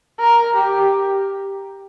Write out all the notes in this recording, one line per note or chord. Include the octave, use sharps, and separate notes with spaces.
A#4
G4